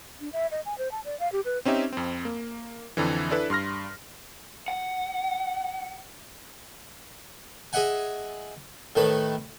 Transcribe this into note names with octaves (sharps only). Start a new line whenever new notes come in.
D4
E5
D#5
G#5
C5
A5
D5
F5
G4
B4
C4 C#4 D#4 G4 E5
F2 C4
A#3
F2 D3 E3
D4 E4 A4 B4
G2 C6 F6 A#6
F#5
G#4 D#5 E5 F#5 G#5
A2 D#3 A3 B4